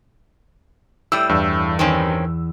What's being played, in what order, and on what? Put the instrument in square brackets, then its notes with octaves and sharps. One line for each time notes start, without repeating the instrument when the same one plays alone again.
[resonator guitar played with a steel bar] A2 G3 [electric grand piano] E6
[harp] E2 [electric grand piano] G2
[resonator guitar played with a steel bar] D#3 C4 C#4